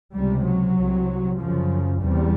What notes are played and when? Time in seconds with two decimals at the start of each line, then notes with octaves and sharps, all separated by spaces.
0.14 C#2 C3 G3
0.45 F#3
0.76 C2 C3
1.39 F#2 C#3 F3
2.01 E2 C3 G3